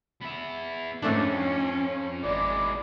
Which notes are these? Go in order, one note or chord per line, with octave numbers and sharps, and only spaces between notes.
B3 E5
F2 G#2 A3 C#4 D4
G#1 E3 G#3 D5